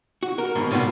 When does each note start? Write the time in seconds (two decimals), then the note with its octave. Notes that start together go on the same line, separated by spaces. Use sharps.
0.23 F#4
0.38 A#4
0.55 G#2 B2 D#3 A#3
0.71 A2 C3 G3 B3 F4 F#4